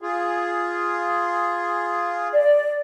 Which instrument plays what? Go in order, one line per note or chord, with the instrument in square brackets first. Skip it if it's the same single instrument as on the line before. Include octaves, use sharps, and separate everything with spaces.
[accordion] F4 G#4
[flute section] D5